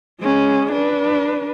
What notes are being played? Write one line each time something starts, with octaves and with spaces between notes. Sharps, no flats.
G#3 C#4
D4 B4